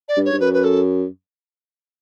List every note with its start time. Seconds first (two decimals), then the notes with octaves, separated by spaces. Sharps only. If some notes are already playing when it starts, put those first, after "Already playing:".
0.08 D5
0.17 G2
0.25 C#5
0.33 G2
0.40 F#2 B4
0.53 B4
0.64 A4